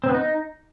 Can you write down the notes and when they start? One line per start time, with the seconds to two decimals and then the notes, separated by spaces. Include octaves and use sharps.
0.04 C4
0.09 B3
0.14 D#4